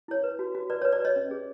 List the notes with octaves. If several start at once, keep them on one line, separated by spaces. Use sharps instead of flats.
E4 C#5
B4
F#4
F#4
B4 D5
C#5
B4
D5
B4 C#5 D#5
C#4
G#4